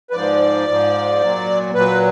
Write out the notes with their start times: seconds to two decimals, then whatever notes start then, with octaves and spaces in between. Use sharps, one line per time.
0.10 B4
0.13 G#2 F3 D5
0.68 G#2 F3
1.21 A#2 F#3
1.75 A#2 F#3 B4